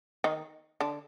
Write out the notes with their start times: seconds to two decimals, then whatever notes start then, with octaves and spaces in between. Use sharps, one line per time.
0.24 D#3 D#4
0.80 D3 D4